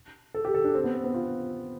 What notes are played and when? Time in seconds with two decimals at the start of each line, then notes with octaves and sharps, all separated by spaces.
0.34 A4
0.45 G4
0.54 A4
0.64 D4
0.75 C4
0.84 B3
0.94 C4
1.04 B3
1.14 F4